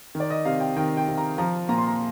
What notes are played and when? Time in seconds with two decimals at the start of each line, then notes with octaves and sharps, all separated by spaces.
0.15 D#3
0.20 D5
0.30 D#5
0.45 C3 F5
0.60 G5
0.76 D#3 G5
0.97 G5
1.08 C3
1.17 A#5
1.38 F3 A#5
1.69 A#2 A#5
1.78 C6
1.87 A#5